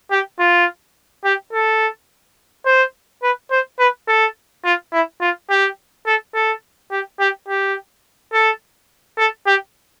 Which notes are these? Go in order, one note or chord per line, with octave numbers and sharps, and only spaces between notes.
G4
F4
G4
A4
C5
B4
C5
B4
A4
F4
E4
F4
G4
A4
A4
G4
G4
G4
A4
A4
G4